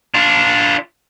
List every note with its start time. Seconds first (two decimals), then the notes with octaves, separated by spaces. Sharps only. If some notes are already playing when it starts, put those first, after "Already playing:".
0.14 D4 F4